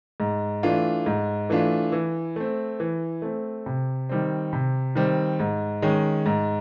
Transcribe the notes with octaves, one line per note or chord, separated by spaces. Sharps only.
G#2
E3 A3 D4 F4
G#2
E3 A3 D4 F4
E3
A3 C4
E3
A3 C4
C3
D#3 G3 C4
C3
D#3 G3 C4
G#2
D#3 G#3 C#4
G#2